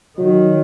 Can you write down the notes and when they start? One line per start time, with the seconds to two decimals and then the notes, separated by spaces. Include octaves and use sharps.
0.18 D#3 F#3